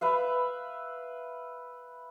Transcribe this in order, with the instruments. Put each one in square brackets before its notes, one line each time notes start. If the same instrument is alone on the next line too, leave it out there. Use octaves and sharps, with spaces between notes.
[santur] B4 E5 F5